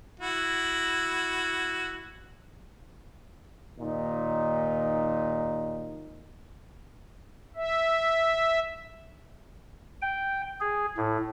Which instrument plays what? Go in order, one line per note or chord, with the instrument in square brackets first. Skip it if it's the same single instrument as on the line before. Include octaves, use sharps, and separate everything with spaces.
[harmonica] E4 F#4
[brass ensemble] D#2 A#2 D#4
[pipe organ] E5
G5
G#4
A2